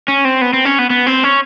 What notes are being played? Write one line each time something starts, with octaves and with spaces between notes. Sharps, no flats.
C#4
C4
B3
C4
C#4
B3
B3
C4
C#4